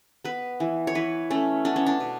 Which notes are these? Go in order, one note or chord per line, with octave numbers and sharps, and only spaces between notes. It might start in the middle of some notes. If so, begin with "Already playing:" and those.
B3 B4
E3
C#5
E3 B4
A3 C#4
B3 D4
C#4
D4
B2